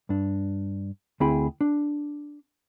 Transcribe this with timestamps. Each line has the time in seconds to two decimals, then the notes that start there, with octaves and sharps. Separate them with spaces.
0.09 G2 D4
1.20 D2 C4 E4 G#4 G5 B5
1.61 D4